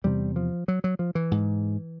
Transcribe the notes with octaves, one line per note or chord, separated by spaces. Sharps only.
E2 C3 G3
F3
F#3
F#3
F3
E3
G#2